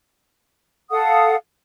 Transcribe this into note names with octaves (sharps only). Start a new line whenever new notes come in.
A4 F5 F#5 D#6